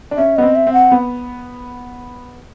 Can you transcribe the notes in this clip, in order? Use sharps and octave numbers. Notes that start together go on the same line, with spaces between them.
D4
C#4 E5
B3 D#5
C4
E5
C4
F#5
B3